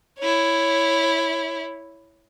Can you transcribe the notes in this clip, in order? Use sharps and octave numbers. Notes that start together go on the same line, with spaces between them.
E4 C#5